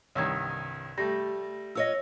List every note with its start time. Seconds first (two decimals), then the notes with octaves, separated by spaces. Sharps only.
0.15 C2 G2 D#3 C#5 E6 G#6
0.98 G3 A3 A#6
1.75 F4 C#5 D#5 E6 A#6